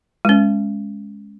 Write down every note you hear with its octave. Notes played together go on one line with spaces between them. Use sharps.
G#3 C#4